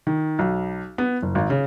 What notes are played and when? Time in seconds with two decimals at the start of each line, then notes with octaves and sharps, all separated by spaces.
0.07 D#3
0.39 B1
0.98 B3
1.22 F#1
1.35 G#1
1.50 C#3